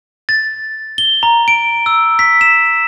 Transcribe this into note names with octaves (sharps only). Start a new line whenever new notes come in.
A6
G7
A#5
D7
E6
B6
E7